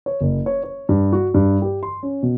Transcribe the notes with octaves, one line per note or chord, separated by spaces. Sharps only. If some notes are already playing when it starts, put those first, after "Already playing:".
C#5
F#1
C#5
C#5
G2
F#4
G2
G4
C6
C#4
B2